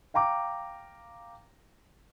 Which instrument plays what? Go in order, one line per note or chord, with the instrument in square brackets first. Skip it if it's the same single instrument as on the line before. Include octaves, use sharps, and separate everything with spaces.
[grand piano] F5 G5 A#5 D6